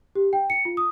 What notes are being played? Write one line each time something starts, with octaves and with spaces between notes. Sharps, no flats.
G4
G5
C#7
F4
D#6